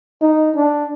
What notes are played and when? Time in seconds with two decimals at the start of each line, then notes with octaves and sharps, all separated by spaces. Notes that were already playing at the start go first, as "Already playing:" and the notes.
0.22 D#4
0.56 D4